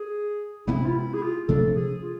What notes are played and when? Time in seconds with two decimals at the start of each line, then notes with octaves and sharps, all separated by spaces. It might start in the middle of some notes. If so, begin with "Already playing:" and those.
Already playing: G#4
0.67 C3 G#3 B3 E4
0.86 F4
0.95 E4
1.14 G#4
1.22 F4
1.48 C3 F3 A3 D4 A4
1.76 G#4
2.02 F4